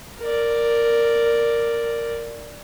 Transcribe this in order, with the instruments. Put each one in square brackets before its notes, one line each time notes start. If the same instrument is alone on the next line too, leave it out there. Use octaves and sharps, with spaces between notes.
[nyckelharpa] A#4 D5